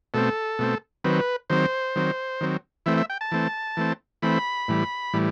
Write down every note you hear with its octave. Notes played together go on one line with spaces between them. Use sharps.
B2 A3 C4 A4
B2 A3 C4
D#3 F#3 C4 B4
D#3 F#3 C4 C5
D#3 F#3 C4
D#3 F#3 C4
E3 A3 C4 E5
E5
G5
A5
E3 A3 C4
E3 A3 C4
E3 A3 C4 B5
A2 E3 G3
A2 E3 G3